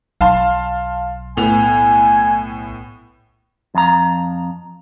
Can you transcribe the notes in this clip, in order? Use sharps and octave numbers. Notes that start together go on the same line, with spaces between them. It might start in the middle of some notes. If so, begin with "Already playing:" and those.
B1 F5 A5 C6
A2 B3 G#5 F7
F2 A#5